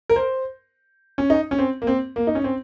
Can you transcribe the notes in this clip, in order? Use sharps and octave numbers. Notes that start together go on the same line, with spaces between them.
A#4
C5
C#4
D#4
C#4
C4
A#3
C4
A#3
D#4
C#4
C4